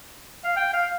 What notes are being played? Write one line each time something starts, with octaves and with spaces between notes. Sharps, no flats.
F5
G5
F5